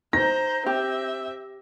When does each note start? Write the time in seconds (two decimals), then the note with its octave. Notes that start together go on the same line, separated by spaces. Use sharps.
0.13 D#4 C5 A#5 A#6
0.66 C4 G4 E5